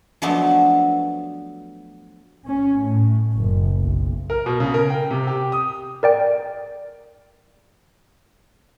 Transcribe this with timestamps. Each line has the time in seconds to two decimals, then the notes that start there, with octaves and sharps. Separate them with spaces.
0.22 F3 F#3 A3 B3 D4
2.46 C#4
2.80 A2
3.34 F#1
3.81 B1
4.30 A#4
4.46 B2
4.60 C#3
4.74 A#4
4.90 G5
5.11 C3
5.27 G4
5.52 D#6
6.03 A#4 D5 G5